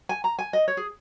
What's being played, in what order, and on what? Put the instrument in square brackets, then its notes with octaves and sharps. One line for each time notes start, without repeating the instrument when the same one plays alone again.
[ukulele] G#5
A#5
G#5
D#5
C#5
G#4